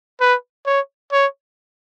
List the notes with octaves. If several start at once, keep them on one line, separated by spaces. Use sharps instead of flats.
B4
C#5
C#5